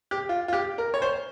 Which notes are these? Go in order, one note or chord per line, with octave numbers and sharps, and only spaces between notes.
G4
F4
F4
G4
A#4
C#5
C5